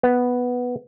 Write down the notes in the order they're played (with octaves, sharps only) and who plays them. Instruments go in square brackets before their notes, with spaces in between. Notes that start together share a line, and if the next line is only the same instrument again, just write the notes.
[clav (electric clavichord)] B3